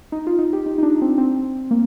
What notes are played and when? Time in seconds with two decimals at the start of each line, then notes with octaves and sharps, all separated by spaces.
0.12 D#4
0.27 F4
0.39 D#4
0.53 G4
0.66 D#4
0.78 D#4
0.83 D4
1.01 C4
1.18 C4
1.71 A#3